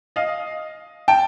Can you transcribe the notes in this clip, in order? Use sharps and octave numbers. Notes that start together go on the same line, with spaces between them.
D#5 F5
G5 A5